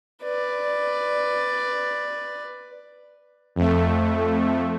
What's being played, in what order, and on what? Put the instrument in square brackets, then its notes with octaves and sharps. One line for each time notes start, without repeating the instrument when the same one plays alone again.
[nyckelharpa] B4 D5
[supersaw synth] F2 A3